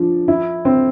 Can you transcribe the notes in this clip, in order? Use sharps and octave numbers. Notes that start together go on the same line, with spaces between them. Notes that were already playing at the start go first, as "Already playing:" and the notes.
Already playing: F3 D4
E4
C4